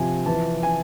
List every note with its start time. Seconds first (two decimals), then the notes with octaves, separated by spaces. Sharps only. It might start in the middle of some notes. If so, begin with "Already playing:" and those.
Already playing: C3 F3 C4 G#5
0.26 E3 A5
0.63 G#5